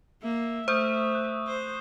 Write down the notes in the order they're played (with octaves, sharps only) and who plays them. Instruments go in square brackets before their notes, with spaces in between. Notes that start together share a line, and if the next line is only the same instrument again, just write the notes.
[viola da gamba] A#3 [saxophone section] E5
[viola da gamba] A3 [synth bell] C5 [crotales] C#6 D#6 G6
[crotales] F#6
[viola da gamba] C5